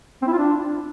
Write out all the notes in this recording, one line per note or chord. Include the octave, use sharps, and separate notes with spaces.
C4
E4
F4
D4